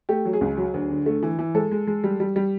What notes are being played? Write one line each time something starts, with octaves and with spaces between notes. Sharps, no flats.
A3 G4
F#3
G#4
C#2
F#3
D2
D3
A3
E3
E3
G#3 A4
G#3
G#3
G3
G3
G3